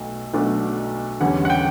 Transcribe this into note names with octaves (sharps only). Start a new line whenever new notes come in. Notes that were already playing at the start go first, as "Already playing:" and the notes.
Already playing: B1 B2 A3
B1 B2 A3 D4
E2 D3 G3 C#4 F#5
F#5
G5